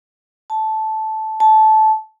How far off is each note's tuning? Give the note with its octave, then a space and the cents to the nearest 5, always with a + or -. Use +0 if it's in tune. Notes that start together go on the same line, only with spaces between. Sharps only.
A5 -10
A5 -15